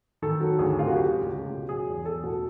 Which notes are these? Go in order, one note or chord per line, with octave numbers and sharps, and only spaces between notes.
D#3 A4
F#3
D2 G#4
C3 F4
F#4
F#3 G4
C#2
C#2
B2
F#3 G#4
E2
E2 A4
B2